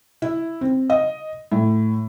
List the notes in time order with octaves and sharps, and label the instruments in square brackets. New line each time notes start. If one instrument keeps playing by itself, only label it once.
[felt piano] E4
C4
D#5
A2